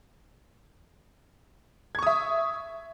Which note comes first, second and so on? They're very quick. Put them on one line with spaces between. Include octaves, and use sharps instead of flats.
G#6 C#6 D#6 E5